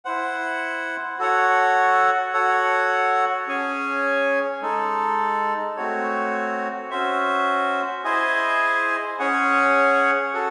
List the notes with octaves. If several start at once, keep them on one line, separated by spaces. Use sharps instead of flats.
E4 C5 F#5
F#4 A4 C#5 F#5
F#4 A4 C#5 F#5
C#4 G#4 C#5 G#5
G#3 D#4 A4
A3 C4 F#4 C#5
C#4 F#4 C5 E5
E4 G#4 C5 D#5 G#5
C#4 G#4 C#5 F#5
F#4 A4